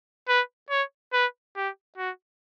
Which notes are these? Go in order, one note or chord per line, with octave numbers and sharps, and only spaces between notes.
B4
C#5
B4
G4
F#4